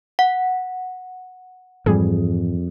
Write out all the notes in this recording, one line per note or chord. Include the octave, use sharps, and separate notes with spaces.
F#5
F2 G#2 E3 G3 G#4